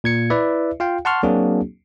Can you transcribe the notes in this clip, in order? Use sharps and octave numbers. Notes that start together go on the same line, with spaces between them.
A#2 G#6 C#7
E4 B4 D5 E5
F4 F5 G5
F#5 A5 C6 C#6 F6
F#3 A#3 C4 D4 F#4 G#4